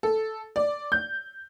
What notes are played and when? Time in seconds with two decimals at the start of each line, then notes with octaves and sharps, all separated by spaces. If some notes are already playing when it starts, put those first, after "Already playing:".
0.03 A4
0.56 D5
0.92 G6